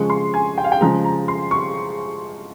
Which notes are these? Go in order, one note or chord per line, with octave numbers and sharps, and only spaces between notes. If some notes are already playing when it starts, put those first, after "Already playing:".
Already playing: C#3 F3 G#3 C#6
C6
G#5
G5
F5
G5
C#3 F3 G#3 A#5
A#5
C6
C#6